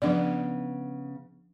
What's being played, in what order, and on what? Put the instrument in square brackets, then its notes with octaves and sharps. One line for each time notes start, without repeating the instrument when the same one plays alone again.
[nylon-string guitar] C#3 B3 [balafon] F3 D4 D5